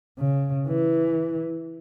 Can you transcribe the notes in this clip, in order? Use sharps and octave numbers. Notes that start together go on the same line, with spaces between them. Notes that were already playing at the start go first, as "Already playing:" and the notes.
C#3
E3